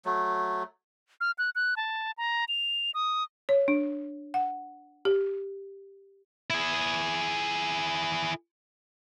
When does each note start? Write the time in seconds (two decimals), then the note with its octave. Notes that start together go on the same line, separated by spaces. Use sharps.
0.05 F#3 A3
1.21 F6
1.38 F#6
1.55 F#6
1.77 A5
2.18 A#5
2.48 F7
2.94 D#6
3.49 C#5
3.68 D4
4.34 F#5
5.05 G4
6.50 E4 G#4